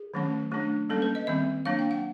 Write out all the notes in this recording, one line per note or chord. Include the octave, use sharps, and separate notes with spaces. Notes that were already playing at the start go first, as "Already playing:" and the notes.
Already playing: G#4
D#3 F#3 A3 C#4
F#3 A3 D4
G3 A#3 C#4 A4
B4
D#5
D#3 G3 C4 E5
F#3 A#3 D4 F5
G5
F#5